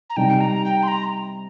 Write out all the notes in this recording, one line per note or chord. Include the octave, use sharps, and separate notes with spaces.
A#5
C3 G3 D#4 G4 G5
A#5
G5
C6
A#5